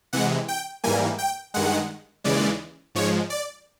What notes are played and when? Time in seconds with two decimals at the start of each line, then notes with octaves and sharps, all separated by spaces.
0.13 C3 E3 G#3 F#5
0.48 G5
0.84 G#2 E3 G3 A#3 G#5
1.18 G5
1.54 G2 D#3 G#3 F#5
2.24 D#2 C#3 E3 G#3 D5
2.95 G#2 F3 G#3 C#5
3.30 D5